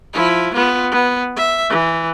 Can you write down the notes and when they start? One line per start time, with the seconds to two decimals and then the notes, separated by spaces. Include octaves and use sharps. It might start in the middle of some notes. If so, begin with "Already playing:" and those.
0.14 F3 E4
0.54 B3 F4
0.92 B3
1.37 E5
1.69 E3